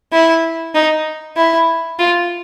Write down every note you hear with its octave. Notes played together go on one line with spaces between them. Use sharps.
E4
D#4
E4
F4